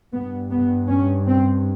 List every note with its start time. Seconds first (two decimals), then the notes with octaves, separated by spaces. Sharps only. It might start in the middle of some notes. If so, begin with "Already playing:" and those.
0.13 G2 B3
0.51 B3
0.89 C#4
1.27 C4